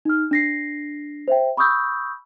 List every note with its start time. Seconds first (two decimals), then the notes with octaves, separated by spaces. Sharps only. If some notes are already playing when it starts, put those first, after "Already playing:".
0.05 D#4 F6
0.31 D4 A#6 C7
1.28 C5 E5 G5
1.57 B5 C#6 D#6 E6 G6